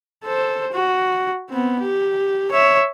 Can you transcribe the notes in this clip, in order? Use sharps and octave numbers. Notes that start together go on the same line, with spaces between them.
A4 C5
F#4
B3 C4
G4
C#5 E5